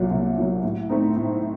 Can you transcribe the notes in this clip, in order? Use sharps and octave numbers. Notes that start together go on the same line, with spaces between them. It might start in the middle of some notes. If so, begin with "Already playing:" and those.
Already playing: C2 A#2 F#3
C2
A#2 F#3
A2
A3 C4 D#4
A2